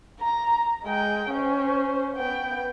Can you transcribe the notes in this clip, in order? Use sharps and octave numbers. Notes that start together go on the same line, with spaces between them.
A#5
G#3 G5
C#4 C5
B3 G5